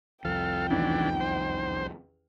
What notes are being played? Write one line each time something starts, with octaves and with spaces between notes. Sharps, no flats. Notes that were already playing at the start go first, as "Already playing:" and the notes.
C2 F2 F3 A4 F5 G5
A1 E2 D#3 E3 D4
C5